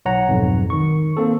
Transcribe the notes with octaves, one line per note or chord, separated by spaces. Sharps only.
B1 C#5 F#5 A#5
B1 F2 G#2
D#3 C#6
A#3 C4 A4